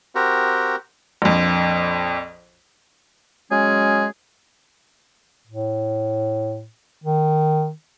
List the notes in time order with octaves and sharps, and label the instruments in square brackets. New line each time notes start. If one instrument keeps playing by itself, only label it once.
[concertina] C4 F#4 G4 A#4
[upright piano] A#1 F2
[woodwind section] F#3 G#3 C#4 G#4
[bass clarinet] A2
D#3